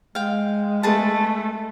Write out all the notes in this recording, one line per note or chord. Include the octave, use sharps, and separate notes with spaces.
G#3 F5 G5
A3 G#4 B4 A5